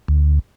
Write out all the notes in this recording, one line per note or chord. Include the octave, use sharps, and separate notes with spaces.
D2